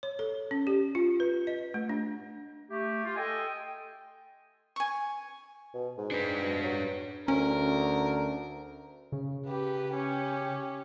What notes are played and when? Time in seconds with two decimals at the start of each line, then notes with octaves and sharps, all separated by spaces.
0.03 C#5
0.19 A4
0.51 C#4
0.67 G4
0.95 F4
1.20 B4
1.47 D#5
1.74 A3
1.89 D4
2.70 A3 G4
3.04 F4
3.16 A4 D#5 G5 G#5
4.76 G#5 C#6
5.74 B2
5.98 G#2
6.11 D4 B4
6.42 B2
6.63 F#3
7.28 D2 C#4 A#4
9.12 C#3
9.47 G4 B4
9.95 C#4 G4